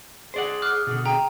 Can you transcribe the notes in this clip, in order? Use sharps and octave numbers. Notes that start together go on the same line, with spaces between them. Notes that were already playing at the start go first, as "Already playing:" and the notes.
G#4 C5 D5 F#5
D6 F6 F#6
B2 D3
G5 A#5